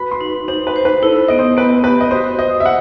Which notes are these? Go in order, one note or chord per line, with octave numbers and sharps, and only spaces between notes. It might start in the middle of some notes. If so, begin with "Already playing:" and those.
Already playing: F#4 B4 B5
C6
D#4
D#4 C5
B4
C5
B4
E4 A4
B3 D#5
C5
B3 B4
G4 B4
D#5
F#4 C5
C5 D#5
E5
F#5